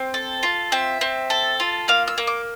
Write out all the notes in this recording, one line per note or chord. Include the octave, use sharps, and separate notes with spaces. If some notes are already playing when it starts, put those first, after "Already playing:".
Already playing: C4 C5
A4
F4
C4 E5
C4
A4
F4
A#3 F5
E6
A#3
D6